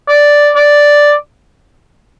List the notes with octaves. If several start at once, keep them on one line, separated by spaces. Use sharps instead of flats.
D5
D5